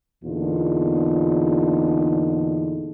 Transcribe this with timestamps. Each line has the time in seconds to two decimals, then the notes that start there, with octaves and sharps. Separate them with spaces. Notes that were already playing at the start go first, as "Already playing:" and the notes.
0.23 E2 A#2 D3 D#4 F4